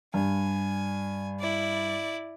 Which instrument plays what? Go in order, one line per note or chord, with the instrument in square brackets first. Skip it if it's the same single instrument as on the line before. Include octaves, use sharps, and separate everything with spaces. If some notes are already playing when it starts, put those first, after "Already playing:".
[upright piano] G2 [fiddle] G#5
[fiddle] E4 D5